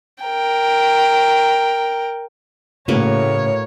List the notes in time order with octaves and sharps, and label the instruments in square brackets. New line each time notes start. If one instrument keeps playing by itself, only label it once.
[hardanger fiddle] A#4 G5
[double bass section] A2 [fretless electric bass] C#3 [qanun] A#3 F#4 B4 [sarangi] C#5